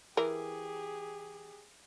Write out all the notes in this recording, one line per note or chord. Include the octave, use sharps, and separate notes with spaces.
E3 G4 G#4 A#4